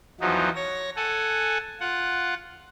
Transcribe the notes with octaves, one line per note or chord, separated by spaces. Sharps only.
E2 F3 F#3 D#4
C#5 A#6
A4 F#5 G#5
F4 F#5